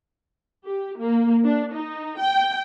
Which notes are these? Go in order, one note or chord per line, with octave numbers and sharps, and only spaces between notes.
G4
A#3
D4
D#4
G5